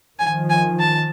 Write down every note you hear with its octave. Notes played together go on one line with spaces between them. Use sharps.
D#3 F3 G#5
G#5
A5